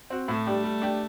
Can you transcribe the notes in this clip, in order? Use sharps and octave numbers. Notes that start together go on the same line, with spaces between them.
C4 F#4
A2 A3
G3 D4 G4
G3
D4 G4